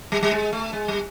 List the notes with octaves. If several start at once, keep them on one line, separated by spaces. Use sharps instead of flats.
G3
G3
G#3
A3
G#3
G3